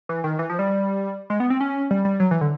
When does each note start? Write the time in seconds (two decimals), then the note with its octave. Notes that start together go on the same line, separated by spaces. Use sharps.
0.09 E3
0.24 D#3
0.39 E3
0.50 F3
0.59 G3
1.30 G#3
1.40 B3
1.50 C4
1.60 C#4
1.91 G3
2.05 G3
2.20 F#3
2.31 E3
2.41 D3